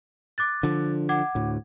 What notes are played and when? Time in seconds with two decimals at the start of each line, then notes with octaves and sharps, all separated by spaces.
0.38 D6 F#6 A6
0.63 D3 F3
1.09 F#5 D6 G#6
1.35 D2 A2